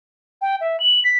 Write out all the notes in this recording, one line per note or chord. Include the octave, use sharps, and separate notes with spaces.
G5
E5
F#7
B6